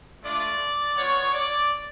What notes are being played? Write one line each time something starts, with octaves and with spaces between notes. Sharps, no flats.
A3 D4 F4 D5
B3 F4 C#5
D5